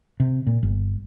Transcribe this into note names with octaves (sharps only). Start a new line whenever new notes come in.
C3
A#2
G1